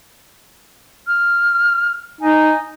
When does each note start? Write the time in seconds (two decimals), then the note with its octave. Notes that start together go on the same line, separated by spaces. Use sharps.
1.08 F6
2.21 D#4 G#5